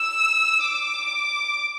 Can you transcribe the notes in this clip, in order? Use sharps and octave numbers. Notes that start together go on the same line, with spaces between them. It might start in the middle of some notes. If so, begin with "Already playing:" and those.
Already playing: E6
D6